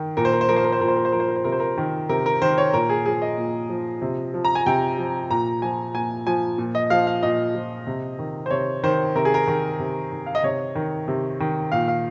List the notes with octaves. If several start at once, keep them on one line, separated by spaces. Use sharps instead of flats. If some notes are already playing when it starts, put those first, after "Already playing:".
Already playing: D#3
A#2 A#4
C5
A#4
C5
F3 A#4
C5
A#4
C5
A#2 A#4
C5
A#4
C5
F3 A#4
C5
A#4
C5
C3 A#4
C5
A#4
D#3
C3 A#4
A#4
D#3 C5
C#5
A#2 A#4
G#4
F3 G#4
D#5
A#2
F3
C3
F3
A#5
G#5
C3 G5
F3
A#2 A#5
F3 G#5
A#2 G#5
F3 G#5
A#2
D#5
F3 F5
F5
A#2 D#5
F3
C3
D#3
C5
C3 C#5
D#3 C5
C3 A#4
G#4
A#4
D#3
C3
D#3
F5
D#5
C3 C#5
D#3
C3
D#3
A#2 F5
F5